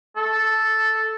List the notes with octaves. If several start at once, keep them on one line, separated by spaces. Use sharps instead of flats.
A4